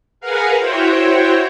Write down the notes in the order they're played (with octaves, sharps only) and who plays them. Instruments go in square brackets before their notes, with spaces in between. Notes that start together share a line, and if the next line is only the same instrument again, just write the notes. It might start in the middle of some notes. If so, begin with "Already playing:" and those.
[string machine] G#4 A#4 B4 F5 F#5 G#5
E4 F#4 C5 C#5 G5